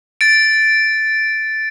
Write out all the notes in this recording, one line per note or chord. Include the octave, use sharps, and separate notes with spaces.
A6 D7